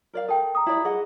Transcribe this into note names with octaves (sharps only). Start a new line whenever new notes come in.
A#4 D5 F5
A4 A#4 G5
A#5 D#6
E4 G4 D5
G#4 D#5 F#5